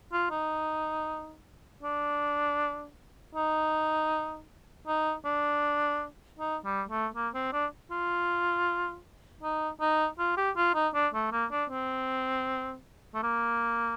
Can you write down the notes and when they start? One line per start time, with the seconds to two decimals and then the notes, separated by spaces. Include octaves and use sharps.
0.12 F4
0.31 D#4
1.83 D4
3.35 D#4
4.87 D#4
5.25 D4
6.39 D#4
6.65 G3
6.89 A3
7.15 A#3
7.34 C4
7.53 D4
7.91 F4
9.43 D#4
9.81 D#4
10.19 F4
10.37 G4
10.56 F4
10.75 D#4
10.94 D4
11.14 A3
11.32 A#3
11.51 D4
11.70 C4
13.14 A3
13.23 A#3